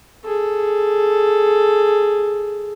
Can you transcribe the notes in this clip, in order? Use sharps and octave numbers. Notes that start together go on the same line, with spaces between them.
G#4 A4